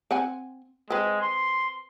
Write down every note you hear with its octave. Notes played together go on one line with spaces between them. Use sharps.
C4 F#5 G#5
G#3 C4 B4
C6